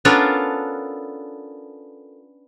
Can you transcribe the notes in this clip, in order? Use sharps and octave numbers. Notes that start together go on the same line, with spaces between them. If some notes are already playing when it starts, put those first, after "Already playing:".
B3 C#4 D4 F4 A4 A#4